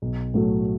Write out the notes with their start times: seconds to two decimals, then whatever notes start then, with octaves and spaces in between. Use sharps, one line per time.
0.02 B1
0.34 A2 F#3 A3